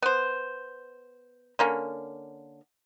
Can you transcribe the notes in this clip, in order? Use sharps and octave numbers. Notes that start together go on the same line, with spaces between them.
B3 C5
D3 A#3 C#4